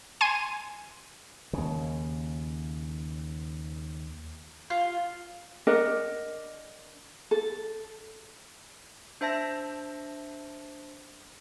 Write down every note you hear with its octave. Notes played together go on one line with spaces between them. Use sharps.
G#5 C6 G#6 D#7
D#2 C#3
F4
D4 A#4 D#5 F#5
A4
D4 C5 E5 A5 A#6